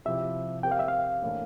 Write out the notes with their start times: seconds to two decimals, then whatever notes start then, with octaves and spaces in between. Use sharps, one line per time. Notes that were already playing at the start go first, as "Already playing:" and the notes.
0.05 C3 F3 C4 E4 G4 E5
0.63 C4 G4 A#4 G5
0.71 F5
0.79 E5
0.88 F5
1.22 A2 E3 A#3 D4